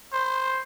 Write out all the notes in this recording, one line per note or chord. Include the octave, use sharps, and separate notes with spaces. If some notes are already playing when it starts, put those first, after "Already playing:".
C5